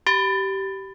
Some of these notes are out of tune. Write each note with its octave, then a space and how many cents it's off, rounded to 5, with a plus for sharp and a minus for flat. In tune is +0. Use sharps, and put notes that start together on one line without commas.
G4 -20